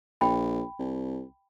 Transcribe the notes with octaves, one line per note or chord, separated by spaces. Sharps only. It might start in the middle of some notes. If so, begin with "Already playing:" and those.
A#1 G5 B5
C2